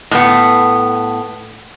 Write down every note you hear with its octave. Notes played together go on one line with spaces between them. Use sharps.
A2 B3